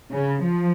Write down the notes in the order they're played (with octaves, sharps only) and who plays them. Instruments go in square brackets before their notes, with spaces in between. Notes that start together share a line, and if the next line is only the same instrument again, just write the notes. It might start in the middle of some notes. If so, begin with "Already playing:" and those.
[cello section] C#3
F3